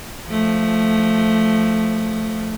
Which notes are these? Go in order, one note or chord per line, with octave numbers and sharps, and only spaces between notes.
F3 A3